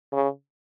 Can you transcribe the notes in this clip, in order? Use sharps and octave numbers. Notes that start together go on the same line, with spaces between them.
C#3